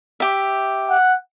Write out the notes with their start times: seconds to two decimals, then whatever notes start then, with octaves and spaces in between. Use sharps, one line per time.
0.20 G4 E5
0.90 F#5